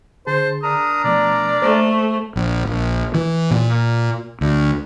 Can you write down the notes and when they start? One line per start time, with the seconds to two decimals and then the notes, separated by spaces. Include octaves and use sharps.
0.27 D3 G#4 C5 A5
0.63 D4 A#4 A#5 D#6
1.04 B2 F3 A3 D5
1.62 A3 A#3 C5
2.36 A#1
2.67 A#1
3.14 E3
3.51 A#2
4.41 D2